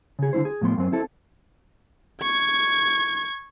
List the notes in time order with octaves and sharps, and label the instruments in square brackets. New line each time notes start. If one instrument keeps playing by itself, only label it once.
[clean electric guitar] C#3 G#4
D3 A#3 E4 C5
G#4
A2 F3 B3 C6
F#2 C4
C4 E4 A4
[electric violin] C#6 G#6